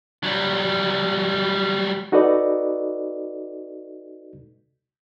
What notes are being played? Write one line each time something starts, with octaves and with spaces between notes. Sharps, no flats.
F#3 G3
D#4 F#4 A4 B4 D5 D#5